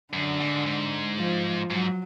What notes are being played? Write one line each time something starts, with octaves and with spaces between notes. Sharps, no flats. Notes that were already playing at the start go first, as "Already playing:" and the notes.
F#2 D3
G#2
G#2
F3
G#2 F#3